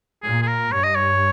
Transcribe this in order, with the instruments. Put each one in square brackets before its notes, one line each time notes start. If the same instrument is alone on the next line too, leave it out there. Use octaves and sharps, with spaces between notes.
[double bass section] A#2 [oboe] G#4
[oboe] G#4
A#4
[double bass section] G2 [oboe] C#5
[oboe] D#5
C#5